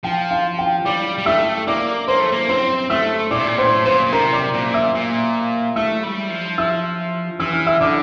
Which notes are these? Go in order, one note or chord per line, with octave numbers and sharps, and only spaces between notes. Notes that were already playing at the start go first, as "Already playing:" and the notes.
F3 G5
F5
G5
G3 D5 D6
G3
A3 E5 E6
A#3 D5 D6
A#3 C5 C6
A3
A#3
C4 C5 C6
A3 E5 E6
A#2 D5 D6
C3
A#2
A2 C5 C6
A#2 C5 C6
A#2
C3 A#4 A#5
D5 D6
A#2
E5 E6
A#2
A3 E5 E6
G3
F3
E5 E6
E3 E6
F6
E5 E6
D3 D5 D6